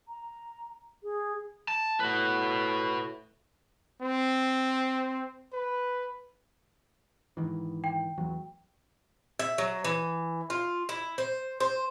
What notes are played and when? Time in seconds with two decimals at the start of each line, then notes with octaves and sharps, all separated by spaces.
0.08 A#5
1.03 G#4
1.68 A5
2.00 A2 F#4 B4
4.01 C4
5.53 B4
7.37 G#2 D#3 E3
7.84 G5
8.18 A1 E2 F#3
9.39 E5
9.58 F#3
9.84 E3
10.50 F4
10.89 E4
11.18 C5
11.60 C5